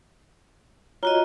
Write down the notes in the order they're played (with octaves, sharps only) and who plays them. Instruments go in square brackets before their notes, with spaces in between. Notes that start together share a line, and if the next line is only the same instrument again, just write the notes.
[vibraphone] F4 F#4 D#5 [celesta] C#5 A#5 G7